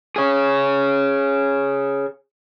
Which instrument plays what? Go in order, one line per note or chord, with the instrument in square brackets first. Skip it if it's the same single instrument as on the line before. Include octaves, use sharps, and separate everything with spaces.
[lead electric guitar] G#4 C#5